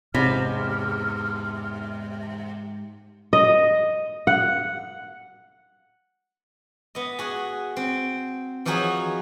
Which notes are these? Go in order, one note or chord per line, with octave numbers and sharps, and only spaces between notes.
E2 G#2 C3 C#4 B5 F6
D#5
F#5
B3 D#5
F#4 G#4
C4
E3 F3 D#4 F#4 G#4 C#5